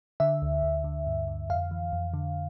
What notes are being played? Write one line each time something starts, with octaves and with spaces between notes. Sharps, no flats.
D3 E5
D2
D2
D3
G2
D3
F2 F5
E3
F2
D3